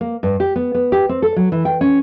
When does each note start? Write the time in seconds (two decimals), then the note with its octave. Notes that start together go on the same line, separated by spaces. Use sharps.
0.01 A#3
0.23 G2
0.40 G4
0.56 B3
0.75 B3
0.92 G4
1.09 C4
1.22 A4
1.36 F#3
1.52 E3
1.65 G5
1.81 C#4